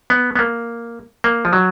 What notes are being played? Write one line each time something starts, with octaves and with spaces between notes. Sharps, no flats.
B3
B3
A#3
A#3
F3
F#3